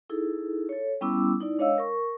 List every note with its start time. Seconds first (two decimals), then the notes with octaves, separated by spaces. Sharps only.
0.10 D#4 E4 G#4 A4
0.69 A4 C#5
1.01 G3 B3 C#4 E4 D6 E6
1.41 D#4 E4 D5
1.58 G#3 D4 C#5 D#5 F5 E6
1.78 A#4 C#6